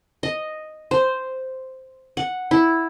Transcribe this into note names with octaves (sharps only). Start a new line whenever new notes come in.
D#5
C5
F#5
E4